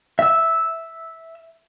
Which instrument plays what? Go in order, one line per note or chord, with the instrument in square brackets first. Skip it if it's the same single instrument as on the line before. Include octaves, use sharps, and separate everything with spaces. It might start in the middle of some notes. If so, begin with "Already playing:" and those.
[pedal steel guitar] E5 E6